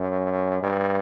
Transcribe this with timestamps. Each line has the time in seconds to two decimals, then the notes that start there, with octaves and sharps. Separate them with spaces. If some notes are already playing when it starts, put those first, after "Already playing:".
Already playing: F#2
0.63 G2